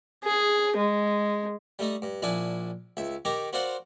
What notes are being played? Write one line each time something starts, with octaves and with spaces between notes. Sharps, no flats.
G#4
G#3
G3 A3 D#4
G2
A#1 D4 E4 G#5 A5
C#2 E5
D#3 G4 A#5 C#6 D6
F#4 A#4 C5 D5 F5 F#5